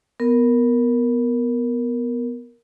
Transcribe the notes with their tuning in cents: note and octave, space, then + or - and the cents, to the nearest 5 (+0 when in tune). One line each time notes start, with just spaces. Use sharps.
B3 +0 A#4 +0